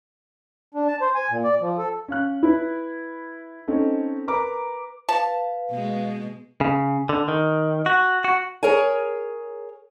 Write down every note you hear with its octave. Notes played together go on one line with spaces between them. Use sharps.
D4
A5
C5
G#5
A#2
D5
F3
A4
C#4 F5 F#6
E4 B4
C4 C#4 D#4 A4
A#4 B4 A#5 D6
B4 F5 A5
B2 G#3
C#3
D3
D#3
F#4
F#4
G#4 A#4 C#5 G#5